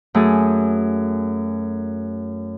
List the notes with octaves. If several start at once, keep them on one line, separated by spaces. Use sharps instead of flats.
F#2 A3 G#4